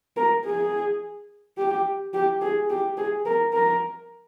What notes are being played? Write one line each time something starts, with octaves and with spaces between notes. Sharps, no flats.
A#4
G#4
G4
G4
G#4
G4
G#4
A#4
A#4